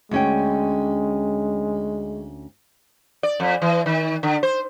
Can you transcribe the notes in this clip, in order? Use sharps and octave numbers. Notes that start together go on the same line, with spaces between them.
D2 G#3 C#4 G5
D5
F2
E3
D#3
D3
C5